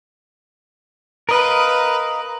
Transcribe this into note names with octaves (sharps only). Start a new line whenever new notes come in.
A#4 B4 D#5 F5